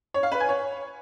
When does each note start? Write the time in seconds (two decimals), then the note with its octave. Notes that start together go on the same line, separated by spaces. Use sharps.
0.14 C#5
0.23 F5
0.32 B4
0.40 G#5
0.49 C#5